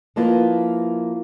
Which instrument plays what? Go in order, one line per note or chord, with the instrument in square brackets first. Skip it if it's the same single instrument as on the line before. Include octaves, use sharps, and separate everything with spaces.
[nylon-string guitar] F3 A#3 E4 F4 B4